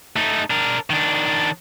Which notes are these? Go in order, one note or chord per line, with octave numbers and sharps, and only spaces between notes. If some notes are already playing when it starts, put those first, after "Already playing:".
A3 D#4
D4 A#4
D#3 D4